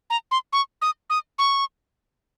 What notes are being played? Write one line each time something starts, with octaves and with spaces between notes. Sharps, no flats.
A#5
C6
C#6
D#6
D#6
C#6